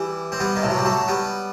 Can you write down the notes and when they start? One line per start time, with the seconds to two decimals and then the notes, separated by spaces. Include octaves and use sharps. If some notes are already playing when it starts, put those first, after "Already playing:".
Already playing: E3 G3
0.32 C4
0.40 G3 B3
0.56 D#3
0.62 A2 C3
0.70 F#3
0.77 G3
0.85 F#3 A3
1.08 G3 B3